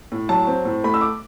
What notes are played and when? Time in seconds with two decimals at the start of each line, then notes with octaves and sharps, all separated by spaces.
0.12 A2
0.29 F#3 A5
0.47 C4
0.65 A2
0.84 A3 B5
0.94 E6
1.01 D6